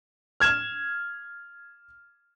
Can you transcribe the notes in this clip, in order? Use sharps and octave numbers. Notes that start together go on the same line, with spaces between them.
F6 G#6 E7